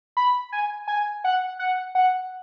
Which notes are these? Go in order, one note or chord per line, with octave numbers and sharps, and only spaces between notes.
B5
G#5
G#5
F#5
F#5
F#5